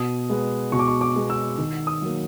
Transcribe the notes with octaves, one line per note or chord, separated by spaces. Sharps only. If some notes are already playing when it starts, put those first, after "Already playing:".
Already playing: B2 D#6
G#3 B3
B2 C#6
D6
C#6
D6
G#3 B3
E6
D#3
D#6
F#3 A#3